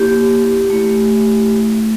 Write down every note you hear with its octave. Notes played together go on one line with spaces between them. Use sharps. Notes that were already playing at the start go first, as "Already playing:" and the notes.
Already playing: A#3 E4 G4
A3 E4